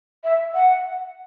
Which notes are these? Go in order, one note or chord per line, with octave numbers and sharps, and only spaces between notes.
E5
F#5